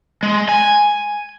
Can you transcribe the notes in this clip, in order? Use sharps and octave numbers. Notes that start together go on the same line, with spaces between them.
G#3
G#5